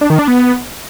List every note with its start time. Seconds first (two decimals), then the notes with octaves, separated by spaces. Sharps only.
0.01 D4
0.10 D#3
0.19 D4
0.28 B3